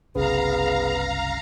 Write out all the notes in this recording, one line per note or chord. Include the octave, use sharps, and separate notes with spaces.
F#1 C2 C#3 B3 G#4 F5 A#5